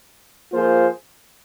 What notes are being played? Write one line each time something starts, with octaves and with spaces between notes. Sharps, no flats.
F3 A#3 F4 G#4 C5